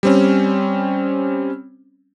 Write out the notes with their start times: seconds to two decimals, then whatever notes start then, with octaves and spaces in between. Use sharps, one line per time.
0.03 G3 C4 C#4